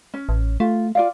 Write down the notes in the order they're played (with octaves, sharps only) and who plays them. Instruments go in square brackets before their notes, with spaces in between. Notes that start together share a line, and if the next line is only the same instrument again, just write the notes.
[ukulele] C#4
[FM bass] A1
[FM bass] A3 [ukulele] F4
[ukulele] F4 D5 F5